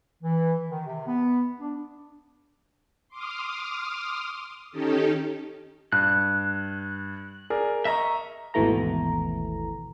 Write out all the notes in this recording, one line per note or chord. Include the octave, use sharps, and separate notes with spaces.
E3
D#3
C3
B3
D4
C6 D6 D#6 F6
D#3 C#4 D#4 G4 A4
G2 F#6
G#4 A#4 D5
D#5 E5 A#5 C#6
G#1 D#2 B2 E3 A3 A#5